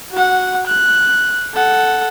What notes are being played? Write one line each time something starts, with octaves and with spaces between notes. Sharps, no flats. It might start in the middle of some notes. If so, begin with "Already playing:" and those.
F#4 F#5
F#6
A4 F#5